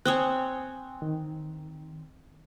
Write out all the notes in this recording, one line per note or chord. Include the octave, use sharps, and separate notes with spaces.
C4 C5 C#5 G#5 D#6 F#6
D#3